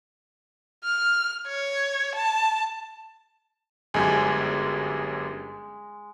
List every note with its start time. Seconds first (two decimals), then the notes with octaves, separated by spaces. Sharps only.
0.84 F6
1.47 C#5
2.15 A5
3.94 G1 F#2 G#3 G4